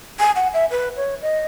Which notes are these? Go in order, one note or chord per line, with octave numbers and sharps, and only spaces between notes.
G#5
F#5
E5
B4
C#5
D#5